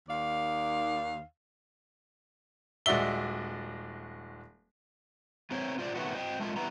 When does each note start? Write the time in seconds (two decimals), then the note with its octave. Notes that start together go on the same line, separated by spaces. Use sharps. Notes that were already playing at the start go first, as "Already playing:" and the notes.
0.09 D#2 D#3 D5 F5
2.86 D#1 G#3 F#4 D5 E5 G7
5.51 A3 C4 A#4 C5 C#5
5.79 F4 C5 D5
5.95 D#3 F#3 A3 B3 F#4 G4
6.14 C5 D#5 G5
6.40 G#3 A3 D4 F4 A#4
6.56 E3 G3 B3 E4 A#5